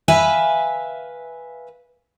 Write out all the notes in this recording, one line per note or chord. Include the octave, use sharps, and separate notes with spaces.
B4 E5 F5 G#5